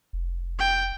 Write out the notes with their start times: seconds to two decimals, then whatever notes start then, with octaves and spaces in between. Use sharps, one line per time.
0.13 F1
0.59 G5